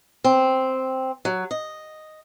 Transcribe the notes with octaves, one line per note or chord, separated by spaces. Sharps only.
C4
F#3
D#5